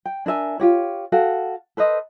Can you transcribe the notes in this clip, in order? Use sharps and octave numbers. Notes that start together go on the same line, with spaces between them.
G5
D4 A#4 E5 G#5
F4 G4 C#5
F#4 A4 F5 G5
A4 B4 C5 D#5